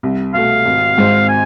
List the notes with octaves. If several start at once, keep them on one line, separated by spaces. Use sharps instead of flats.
C2
B2 A3 F5
G#1
G#2 G#3 C4
G#5